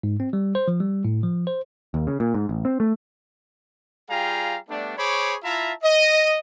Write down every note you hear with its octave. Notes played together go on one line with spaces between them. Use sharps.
G#2
C4
G3
C5
F3
G3
A2
F3
C5
D#2
C#3
A#2
G#2
A1
C4
A3
G3 F4 G#4 F5 G5 A#5
G3 A3 B3 D4
G#4 C5 C#5 B5 C#6 D6
E4 F4 E5 F5 A5 A#5
D#5